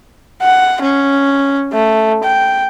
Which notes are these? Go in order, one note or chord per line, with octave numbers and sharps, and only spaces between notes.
F#5
C#4
A3
G5